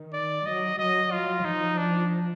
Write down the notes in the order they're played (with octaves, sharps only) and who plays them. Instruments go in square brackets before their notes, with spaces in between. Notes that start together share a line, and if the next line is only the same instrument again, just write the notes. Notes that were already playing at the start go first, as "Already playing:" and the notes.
Already playing: [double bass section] D#3
[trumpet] D5
[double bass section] F#3 [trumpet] D#5
[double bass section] F#3 [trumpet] D#5
[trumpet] F4
[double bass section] F3 [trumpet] D#4
[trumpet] D4